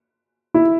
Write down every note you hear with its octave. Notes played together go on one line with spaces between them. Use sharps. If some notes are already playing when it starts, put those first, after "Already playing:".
E4